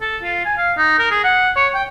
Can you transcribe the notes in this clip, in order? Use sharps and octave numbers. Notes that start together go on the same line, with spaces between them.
A4
F4
G#5
F5
D#4
A#4
G#4
F#5
C#5
G5